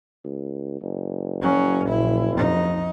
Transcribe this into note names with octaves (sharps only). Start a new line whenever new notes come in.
C#2
F#1
F#3 C#4
A#1 E4
F2 D#4